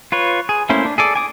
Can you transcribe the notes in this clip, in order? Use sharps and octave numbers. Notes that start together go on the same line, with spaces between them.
F4 B4 C#5
G#4
A3 A#3 C#4 E4 C5
D4
G#4 A4 D5
G#5 D6 D#6